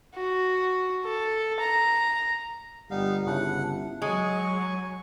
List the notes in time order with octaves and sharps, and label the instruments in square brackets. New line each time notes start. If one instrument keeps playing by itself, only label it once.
[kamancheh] F#4
A4
A#5
[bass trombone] G1 [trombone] G3 [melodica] B3 D#4 F5
[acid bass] C#3 [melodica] D4 F#5 [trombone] E4
[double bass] F#3 [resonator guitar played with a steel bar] G#3 [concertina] G#5 C#6